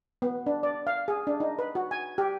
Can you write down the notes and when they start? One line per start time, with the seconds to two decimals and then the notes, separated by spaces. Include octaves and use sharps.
0.22 B3
0.46 D4
0.63 D5
0.87 F5
1.08 G#4
1.27 D4
1.40 D#4
1.59 B4
1.75 F#4
1.91 G#5
2.18 G4